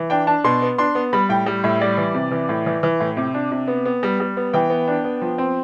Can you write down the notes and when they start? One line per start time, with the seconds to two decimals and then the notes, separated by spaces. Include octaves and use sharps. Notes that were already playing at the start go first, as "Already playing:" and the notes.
Already playing: E3
0.10 D4 G5
0.27 D4 A5
0.44 B2 C6
0.62 B3
0.78 D4 C6
0.95 B3
1.13 G3 B5
1.29 A2 G5
1.46 G3
1.64 A2 E5
1.81 G3 D5
1.98 E3
2.14 C3
2.31 E3
2.49 A2
2.66 E3
2.83 E3
3.00 A2
3.17 C3
3.34 D4
3.52 C3
3.68 B3
3.85 B3
4.03 G3
4.20 G3
4.37 B3
4.54 E3 G5
4.70 B3
4.88 D4
5.04 B3
5.22 F3
5.38 C4